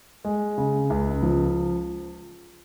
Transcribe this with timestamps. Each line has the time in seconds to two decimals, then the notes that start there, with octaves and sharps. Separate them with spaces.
0.25 G#3
0.58 C#3
0.90 C#2
1.23 F3